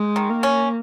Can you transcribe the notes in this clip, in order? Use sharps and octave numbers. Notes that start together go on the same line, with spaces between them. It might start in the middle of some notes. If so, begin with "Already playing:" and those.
Already playing: G#3
D#3
A#3
C#4